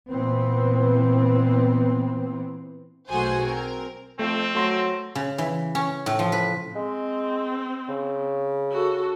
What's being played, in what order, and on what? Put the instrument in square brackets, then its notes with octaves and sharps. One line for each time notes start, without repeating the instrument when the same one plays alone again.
[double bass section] A#2 E3 B3 C4
[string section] B1 A3 F#4 G#4 C5 G#5
C4 A#4
[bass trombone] F2 [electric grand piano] A3 [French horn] C4
[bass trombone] F#3 [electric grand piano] A3 C6 A#6
[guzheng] C#3
E3
C#4
A2
F3
B4
[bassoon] G#3 [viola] C4
[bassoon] C#3
[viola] F#4 A4